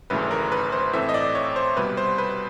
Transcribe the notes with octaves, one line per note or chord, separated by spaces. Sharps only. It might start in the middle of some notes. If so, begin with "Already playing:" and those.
G#1 F#2 C#3 E3 A3 B4
A#4
B4
C5
A2 E3 A3 C4 E5
D#5
D5
C#5
C5
C2 B2 G3 B4
C5
B4